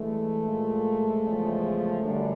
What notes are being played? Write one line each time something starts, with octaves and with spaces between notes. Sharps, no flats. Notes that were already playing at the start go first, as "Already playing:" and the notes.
Already playing: G2 E3 G#3 A3
A#2 F3 G#3
E2 C#3 F3 G#3
F#2 D3 G3